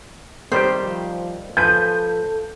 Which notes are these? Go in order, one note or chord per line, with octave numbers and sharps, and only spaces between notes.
C3 D#3 G3 G4 C5
F3
F3 A4 B4 G#5 G6